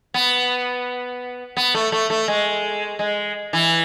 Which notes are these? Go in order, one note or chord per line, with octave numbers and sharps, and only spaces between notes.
B3
B3
A3
A3
A3
G#3
G#3
E3